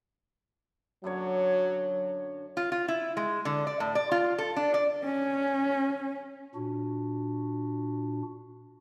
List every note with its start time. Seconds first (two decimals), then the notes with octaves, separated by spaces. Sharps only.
1.04 F#2 D3 F#3 C#5
2.57 F4
2.72 F4
2.88 E4
3.17 G#3
3.45 D3
3.67 D5
3.80 A2
3.95 D5
4.11 F4
4.38 A4
4.56 D4
4.74 D5
5.04 C#4
6.55 A#2 D4 F#4